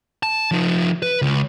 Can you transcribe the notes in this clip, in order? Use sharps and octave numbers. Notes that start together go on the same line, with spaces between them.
A5
F3 D#4
B4
C#2